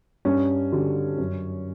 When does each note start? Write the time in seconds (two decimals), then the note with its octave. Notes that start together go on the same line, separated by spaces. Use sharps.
0.25 G2 C#4
0.72 D3 G3 D4 F#4
1.18 F#2